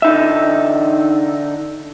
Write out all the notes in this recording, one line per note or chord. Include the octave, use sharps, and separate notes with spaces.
D3 D#4 E5